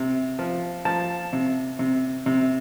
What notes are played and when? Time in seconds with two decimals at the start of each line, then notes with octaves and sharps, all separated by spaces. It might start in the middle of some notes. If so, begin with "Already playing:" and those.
Already playing: C3
0.39 F3
0.85 F3 A5
1.33 C3
1.79 C3
2.26 C3